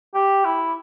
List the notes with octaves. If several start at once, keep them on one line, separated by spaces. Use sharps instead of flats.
G4
E4